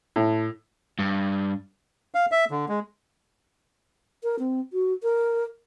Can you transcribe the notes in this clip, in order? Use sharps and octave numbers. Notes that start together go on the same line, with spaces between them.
A2
G2
F5
E5
D3
G#3
A#4
C4
F#4
A#4